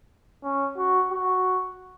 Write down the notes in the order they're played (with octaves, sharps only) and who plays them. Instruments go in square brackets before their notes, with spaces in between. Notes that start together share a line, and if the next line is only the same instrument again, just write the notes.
[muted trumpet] C#4
F#4
F#4